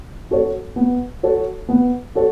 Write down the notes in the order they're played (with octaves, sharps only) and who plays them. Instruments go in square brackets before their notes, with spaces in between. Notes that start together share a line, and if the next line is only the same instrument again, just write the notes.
[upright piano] F#4 A4 C#5
B3
F#4 A4 C#5
B3
F#4 A4 C#5